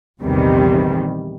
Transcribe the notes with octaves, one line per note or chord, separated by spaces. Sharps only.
A#1 E2 C3 D#3 G3